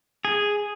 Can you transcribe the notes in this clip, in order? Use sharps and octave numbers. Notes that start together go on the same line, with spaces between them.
G#4